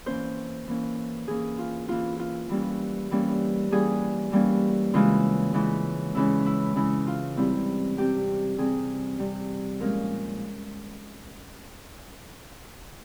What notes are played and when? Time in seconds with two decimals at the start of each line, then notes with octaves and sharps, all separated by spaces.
0.06 E3 A#3 C#4 C5
0.68 E3 A#3 C#4
1.28 E3 A#3 C#4 G#4
1.58 F4
1.88 E3 A#3 C#4 F4
2.19 F4
2.49 E3 G3 A#3 C#4
3.11 E3 G3 A#3 C#4
3.71 E3 G3 A#3 C#4 G#4
4.32 E3 G3 A#3 C#4
4.94 C#3 E3 G#3 C#4 F4
5.53 C#3 E3 G#3 C#4
6.15 C#3 E3 G#3 C#4 E4
6.46 E4
6.76 C#3 E3 G#3 C#4 E4
7.07 F4
7.37 C3 G3 C4 E4
7.97 C3 G3 C4 G4
8.58 C3 G3 C4 G#4
9.19 C3 G3 C4
9.80 A#2 F3 G#3 C#4 A#4